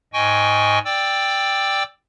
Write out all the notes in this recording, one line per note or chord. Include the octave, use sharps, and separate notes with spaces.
G#2 D#5 G5 G#5 C#6
D5 G5 D6 E6